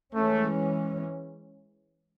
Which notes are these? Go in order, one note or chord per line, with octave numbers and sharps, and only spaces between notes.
E3 G#3 A3 C#4